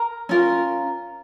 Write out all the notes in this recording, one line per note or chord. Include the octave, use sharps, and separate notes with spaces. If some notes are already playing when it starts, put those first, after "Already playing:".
Already playing: A#4 A#5
C#4 F4 A#4